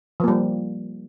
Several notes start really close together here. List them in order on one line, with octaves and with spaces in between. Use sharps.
F3 A#3 G3